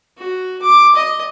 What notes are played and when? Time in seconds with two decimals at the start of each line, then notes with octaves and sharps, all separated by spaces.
0.18 F#4
0.62 D6
0.95 D#5